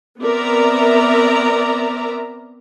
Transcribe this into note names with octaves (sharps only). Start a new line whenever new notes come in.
B3 C4 A#4 D5 E5 A#5